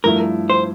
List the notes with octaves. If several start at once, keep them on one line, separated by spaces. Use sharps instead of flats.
G2 F3 A3 E4 A#4
C5